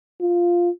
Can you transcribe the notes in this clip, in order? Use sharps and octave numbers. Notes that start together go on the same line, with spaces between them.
F4